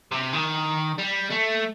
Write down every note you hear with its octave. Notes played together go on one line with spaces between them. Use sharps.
C3
D#3
G3
A3